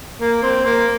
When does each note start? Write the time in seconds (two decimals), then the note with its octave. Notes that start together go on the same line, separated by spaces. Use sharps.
0.20 A#3
0.42 C4
0.65 A#3